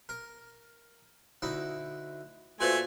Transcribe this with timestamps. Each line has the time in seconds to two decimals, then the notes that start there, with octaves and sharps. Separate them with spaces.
0.09 A#4
1.42 D2 D#4 E4
2.60 A#2 A3 F#4 B4 C5 G#5